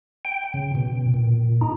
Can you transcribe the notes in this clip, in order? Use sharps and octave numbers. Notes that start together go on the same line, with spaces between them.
G5
C#3
B2
A#2
D#4